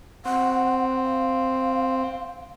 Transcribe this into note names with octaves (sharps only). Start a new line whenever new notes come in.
C4 F#5
F5